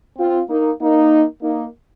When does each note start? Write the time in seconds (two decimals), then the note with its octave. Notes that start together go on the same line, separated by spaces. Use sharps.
0.18 C4 F4
0.49 A#3 D#4
0.80 A#3 D#4
1.43 A#3 D#4